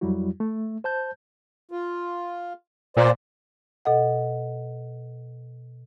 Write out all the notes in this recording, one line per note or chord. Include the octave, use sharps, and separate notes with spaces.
F2 F#3 G3 E4 F#4
A3
C5 A5 G6
F4
A#2 C5 D5
B2 A4 D#5 F#5